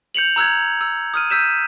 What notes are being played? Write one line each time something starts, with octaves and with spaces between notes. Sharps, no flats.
G6 C#7 F7 F#7
A#5 E6 F#6 G#6
E6
D#6 F6 D#7
E6 G6 B6 D#7 E7